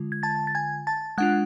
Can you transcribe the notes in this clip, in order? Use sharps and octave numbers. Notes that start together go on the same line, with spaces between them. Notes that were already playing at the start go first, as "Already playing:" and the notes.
Already playing: D3 G#3 F4
G#6
A5 A6
A6
G#5 G#6
A5 A6
G#3 D4 F4 F#5 F#6